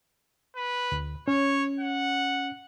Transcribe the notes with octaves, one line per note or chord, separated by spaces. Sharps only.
B4
D2
C#4 C#5
F#5